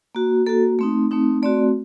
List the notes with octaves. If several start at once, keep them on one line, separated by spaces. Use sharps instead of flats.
A#3 F#4
A#3 F#4 A4
A3 C4 D#4
A3 C4 D#4
A3 C4 F#4 D5